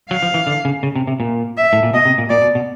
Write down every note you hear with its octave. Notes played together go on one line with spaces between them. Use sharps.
F#3 F5
F3
E3
D3
C#3
C#3
C3
C3
A#2
E5
A2
A#2
B2 D#5
C3
A#2
A#2 D5
B2
B2